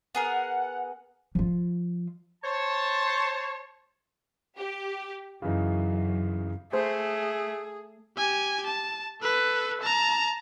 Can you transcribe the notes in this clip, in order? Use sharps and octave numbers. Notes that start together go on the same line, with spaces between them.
B3 G#4 A#4 F#5
F3 F4
C5 C#5 A5
G4
F#2 C#3 E3 D#4
A3 G#4 C5
G4 G#5
A5
A4 B4
A5 A#5